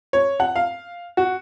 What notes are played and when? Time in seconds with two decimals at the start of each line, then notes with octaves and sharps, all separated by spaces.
0.13 C#5
0.40 F#5
0.56 F5
1.17 F#4